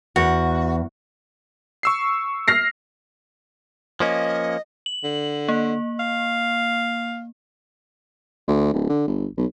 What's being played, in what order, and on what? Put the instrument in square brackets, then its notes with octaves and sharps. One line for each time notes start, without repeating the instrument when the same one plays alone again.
[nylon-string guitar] E2 [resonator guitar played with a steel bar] F#4
[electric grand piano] C#6 E6 C7
[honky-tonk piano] F6 A#6 C7
[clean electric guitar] F3 A#3 C#4 [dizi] D#5
[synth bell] F#7
[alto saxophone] D3
[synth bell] A#3
[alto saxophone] F5
[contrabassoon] D2
D1
D3
G1
B1